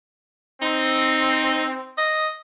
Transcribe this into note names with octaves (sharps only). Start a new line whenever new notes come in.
C4 D#4
D#5